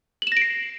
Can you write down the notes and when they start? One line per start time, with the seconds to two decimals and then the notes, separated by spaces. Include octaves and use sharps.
0.22 F#7
0.27 E7
0.32 A#6
0.37 D7
0.42 C7